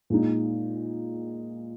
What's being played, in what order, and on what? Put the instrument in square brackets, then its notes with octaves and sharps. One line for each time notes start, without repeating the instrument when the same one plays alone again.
[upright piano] A#2 G#3 D#4